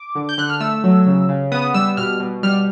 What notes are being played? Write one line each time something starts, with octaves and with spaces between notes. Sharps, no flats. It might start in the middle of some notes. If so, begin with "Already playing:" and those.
Already playing: D6
D3
G6
D3 F#6
F6
A3 E6
F#3
C#3
C#3
B3 D#6
G3 E6
B2 F6
B2
G3 F6